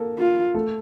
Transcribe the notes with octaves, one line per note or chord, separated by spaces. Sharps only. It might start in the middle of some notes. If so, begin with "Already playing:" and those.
Already playing: A#3 A4 A#4
F4
A3 A4